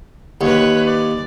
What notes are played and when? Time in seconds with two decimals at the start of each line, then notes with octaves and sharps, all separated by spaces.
0.41 D#2 B4 C#5
0.85 D5